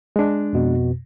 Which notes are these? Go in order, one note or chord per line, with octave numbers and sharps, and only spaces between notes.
G#3 D4
F2 B2